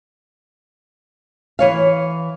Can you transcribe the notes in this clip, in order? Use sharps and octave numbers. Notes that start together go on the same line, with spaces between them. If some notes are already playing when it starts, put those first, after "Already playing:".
E3 C#5 F5